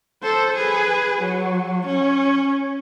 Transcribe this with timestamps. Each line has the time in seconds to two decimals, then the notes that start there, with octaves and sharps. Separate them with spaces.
0.23 A4 C5
0.55 G#4 B4
1.21 F#3
1.86 C#4